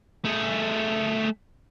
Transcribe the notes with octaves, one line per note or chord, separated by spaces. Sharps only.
A3 G#4